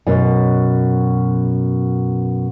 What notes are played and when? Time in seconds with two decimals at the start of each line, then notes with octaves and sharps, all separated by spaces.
0.07 F#2 B2